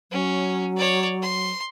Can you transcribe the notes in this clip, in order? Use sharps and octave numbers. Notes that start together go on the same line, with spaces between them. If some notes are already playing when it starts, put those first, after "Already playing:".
F#3 C#4
C#5 D5
C6